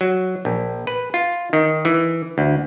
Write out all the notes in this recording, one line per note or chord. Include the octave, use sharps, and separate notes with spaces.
F#3
A#1
B4
F4
D#3
E3
D2